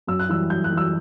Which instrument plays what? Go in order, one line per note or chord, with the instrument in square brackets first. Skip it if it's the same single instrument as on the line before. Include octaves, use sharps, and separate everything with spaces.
[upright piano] F#2 E6
F#6
E3 G3 E6
F#2 G6
F#6
E3 G3
E6